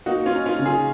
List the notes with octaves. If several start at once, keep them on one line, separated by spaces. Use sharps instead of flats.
A#3 D#4 F#4
C#4 F4
D#4
C#4 F4
C#3
F4 G#4